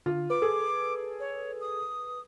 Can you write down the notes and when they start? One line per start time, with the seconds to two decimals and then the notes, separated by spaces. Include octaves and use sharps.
0.06 D3 F4
0.30 B4 D6
0.42 G#4 A4
1.20 C#5
1.61 D#6